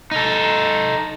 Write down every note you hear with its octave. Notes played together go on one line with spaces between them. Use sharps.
D#4 A4